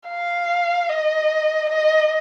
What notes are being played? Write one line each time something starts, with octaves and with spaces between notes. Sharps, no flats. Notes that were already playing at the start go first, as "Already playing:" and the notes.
F5
D#5
D#5